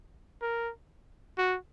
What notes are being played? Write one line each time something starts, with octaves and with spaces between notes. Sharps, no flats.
A#4
F#4